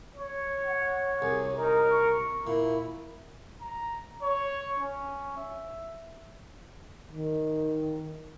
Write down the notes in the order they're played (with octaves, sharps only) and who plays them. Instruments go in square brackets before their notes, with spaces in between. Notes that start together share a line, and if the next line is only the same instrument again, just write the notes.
[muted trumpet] C#5
[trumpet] F#5
[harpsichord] C2 [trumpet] G#4
[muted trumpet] D#4 [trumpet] A#4
[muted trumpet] C#6
[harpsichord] A#2 [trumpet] E4
[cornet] A#5
C#5
C#4
E5
[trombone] D#3